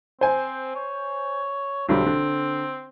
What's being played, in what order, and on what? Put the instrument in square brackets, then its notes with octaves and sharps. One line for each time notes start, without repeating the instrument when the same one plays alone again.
[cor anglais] C4 [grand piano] C5 G#5
[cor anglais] C#5
[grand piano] B1 D3 G3 [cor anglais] C4
[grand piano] D3